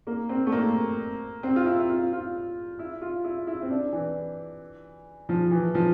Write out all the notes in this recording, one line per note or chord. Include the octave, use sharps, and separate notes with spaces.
A#3
C4
A3
A#3
C4
F4
E4
F4
F4
E4
F4
E4
E4
C4
D4
E3
F3
E3
F3